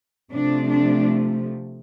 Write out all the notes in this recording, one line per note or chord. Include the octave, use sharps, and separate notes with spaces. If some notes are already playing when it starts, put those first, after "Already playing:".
C3 F3 A3 D4
D4